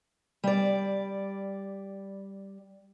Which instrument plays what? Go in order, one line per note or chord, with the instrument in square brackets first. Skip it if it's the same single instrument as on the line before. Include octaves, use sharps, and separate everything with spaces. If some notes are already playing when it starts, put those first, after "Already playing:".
[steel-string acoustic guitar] G3 D5